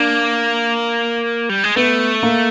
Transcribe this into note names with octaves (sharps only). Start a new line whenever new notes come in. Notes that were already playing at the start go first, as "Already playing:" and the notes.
Already playing: A#3 D4
G3
G#3
A3 B3
A#3